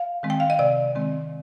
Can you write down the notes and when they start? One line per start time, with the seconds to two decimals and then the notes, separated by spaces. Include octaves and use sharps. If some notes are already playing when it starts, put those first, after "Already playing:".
Already playing: F5
0.23 D#3 G#3 C4
0.30 G5
0.40 F5
0.50 D#5
0.59 C3 D5
0.95 D#3 G#3 C4